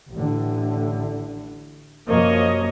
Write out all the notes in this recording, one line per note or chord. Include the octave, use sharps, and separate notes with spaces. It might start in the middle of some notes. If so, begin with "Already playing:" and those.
A1 A2 D3
F#2 C3 F3 A#3 C#5 D#5